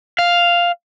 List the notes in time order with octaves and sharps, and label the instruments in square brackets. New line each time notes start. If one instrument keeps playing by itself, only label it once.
[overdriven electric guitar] F5